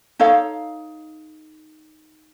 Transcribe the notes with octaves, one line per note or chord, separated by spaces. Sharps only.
D#4 A4 C#5 F5